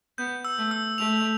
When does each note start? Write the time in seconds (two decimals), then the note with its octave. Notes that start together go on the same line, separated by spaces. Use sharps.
0.18 B3 G6
0.45 E6
0.58 A3
0.71 E6
0.98 A3 F7